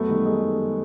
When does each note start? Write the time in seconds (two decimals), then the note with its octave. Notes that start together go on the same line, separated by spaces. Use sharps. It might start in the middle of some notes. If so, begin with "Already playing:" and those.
Already playing: F#2 A3 B3
0.09 D#3 G3
0.26 G#3